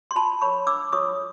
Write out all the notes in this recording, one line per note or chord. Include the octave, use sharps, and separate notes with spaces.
C6
F4 A5 B5
A#4 C#5 B5 C#6
D4 D6 E6
F4 A4 C#5 C#6 D#6